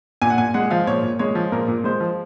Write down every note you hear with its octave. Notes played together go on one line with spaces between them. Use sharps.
A#2 G#5
F#5
A#2 G#5
G#3 F#5
F3 F5
A#2 C#5
A#2
G#3 C#5
F3
A#2 A#4
A#2
G#3 C5
F3